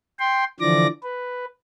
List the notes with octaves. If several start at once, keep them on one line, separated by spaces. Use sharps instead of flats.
G5 C6
D3 E3 F3 D5 D6 A#6
B4